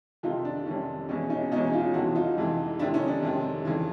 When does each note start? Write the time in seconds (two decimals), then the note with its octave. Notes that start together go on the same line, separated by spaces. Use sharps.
0.23 F2 C3 D#3 D#4 F4
0.45 D4
0.66 F2 C3 D#3 C#4
1.08 E2 B2 C#4
1.30 C#4 D#4
1.51 B2 C#4 D#4
1.56 E2
1.73 D#4 F4
1.94 F2 C3 E3 E4 F#4
2.15 D#4 F4
2.38 F2 C3 E3
2.79 F2 C3 D#3 D4 E4
2.94 C#4 D#4
3.08 D4
3.22 F2 C3 D#3
3.65 F2 C#3 E3